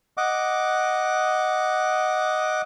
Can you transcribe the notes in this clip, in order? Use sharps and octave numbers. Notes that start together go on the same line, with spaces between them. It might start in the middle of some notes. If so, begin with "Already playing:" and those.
D#5 F#5 D6